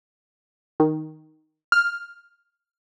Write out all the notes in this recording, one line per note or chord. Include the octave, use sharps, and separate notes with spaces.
D#3
F6